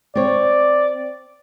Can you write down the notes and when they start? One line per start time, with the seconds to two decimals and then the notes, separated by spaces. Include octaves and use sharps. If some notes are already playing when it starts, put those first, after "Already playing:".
0.15 C4 C#5 D5